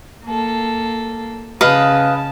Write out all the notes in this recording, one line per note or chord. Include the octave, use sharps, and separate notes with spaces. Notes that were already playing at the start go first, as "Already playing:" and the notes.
A#3 A4
C#3 B4 D#5 F5 A5